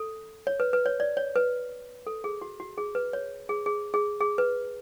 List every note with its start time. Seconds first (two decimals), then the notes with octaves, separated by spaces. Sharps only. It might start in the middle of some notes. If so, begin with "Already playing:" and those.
Already playing: A4
0.47 C#5
0.60 B4
0.73 B4
0.86 C#5
1.00 D5
1.17 C#5
1.36 B4
2.07 A4
2.24 G#4
2.42 F#4
2.60 F#4
2.78 G#4
2.95 B4
3.13 C#5
3.49 G#4
3.66 G#4
3.94 G#4
4.21 G#4
4.38 B4